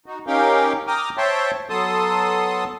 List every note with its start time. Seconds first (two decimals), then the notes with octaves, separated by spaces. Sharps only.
0.06 D#4 F#4
0.27 C#4 D#4 G4 A#4 F5 G5
0.87 G5 A#5 D6 D#6 F6
1.17 C5 C#5 E5 G5 A5 C6
1.70 F#3 B3 A4 A5 C6 D#6